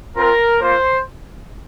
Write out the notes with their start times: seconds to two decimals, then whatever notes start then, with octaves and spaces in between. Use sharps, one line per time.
0.17 C4 F4 A#4
0.60 A#3 F4 C5